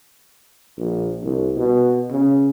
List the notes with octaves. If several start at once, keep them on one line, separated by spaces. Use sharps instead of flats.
A#1
C2
B2
C#3